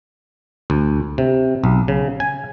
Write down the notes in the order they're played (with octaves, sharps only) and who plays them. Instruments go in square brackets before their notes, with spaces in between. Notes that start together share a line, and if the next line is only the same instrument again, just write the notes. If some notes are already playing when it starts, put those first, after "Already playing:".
[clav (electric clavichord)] D2
C3
B1
C#3
G#5